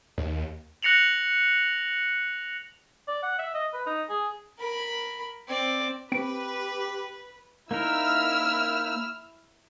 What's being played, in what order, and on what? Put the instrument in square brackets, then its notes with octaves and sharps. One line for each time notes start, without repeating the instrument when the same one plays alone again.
[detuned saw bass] D#2
[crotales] F#6 A#6 C#7 F7 F#7
[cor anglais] D5
F#5
E5
D#5
B4
D#4
G#4
[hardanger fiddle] A#4 B5
C4 D5
[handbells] C4 D7 [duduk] G4 [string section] B4
[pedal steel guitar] A#3 D#4 A#4 [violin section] E4 E6 F6